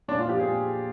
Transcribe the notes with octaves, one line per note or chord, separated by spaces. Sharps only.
A#2 D4
F4
F3 G4
A#2 G#4